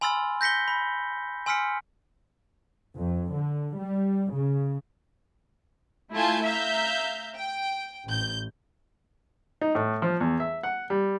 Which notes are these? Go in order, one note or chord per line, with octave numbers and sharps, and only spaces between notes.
G#5 B5 C6 E6 F6 A6
G6 A#6 B6 C#7 G7
B5
G#5 C6 E6 F6 B6 C#7
F2
D3
G3
C#3
A3 E4 F4 G#5 A5 G6
E5 F5 A#5 G6
G5
A1 G6
D#4
A2
F3
E2
E5
F#5
G3